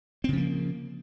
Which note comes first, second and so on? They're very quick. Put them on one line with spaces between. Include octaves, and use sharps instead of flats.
C4 C#3 F3 A#3